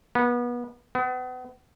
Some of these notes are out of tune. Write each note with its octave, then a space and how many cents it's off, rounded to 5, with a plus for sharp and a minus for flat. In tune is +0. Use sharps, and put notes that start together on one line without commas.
B3 -30
B3 +35